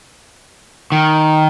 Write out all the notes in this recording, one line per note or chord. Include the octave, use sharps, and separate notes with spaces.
D#3